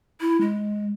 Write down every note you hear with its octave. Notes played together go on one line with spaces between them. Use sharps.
E4
G#3